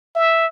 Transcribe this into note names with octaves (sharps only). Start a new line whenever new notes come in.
E5